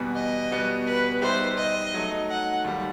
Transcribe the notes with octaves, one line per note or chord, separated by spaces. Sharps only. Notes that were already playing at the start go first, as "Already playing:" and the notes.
Already playing: E2 B2 G3 B3
D#5
B2 G3 B3 F#4
B4
G3 D#4 G4 B4 C5 E5
D#5
F#3 A3 D#4
F#5
D#2 D#3 G3